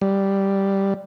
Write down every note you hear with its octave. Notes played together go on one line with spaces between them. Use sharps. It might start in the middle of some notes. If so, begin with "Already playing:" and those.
G3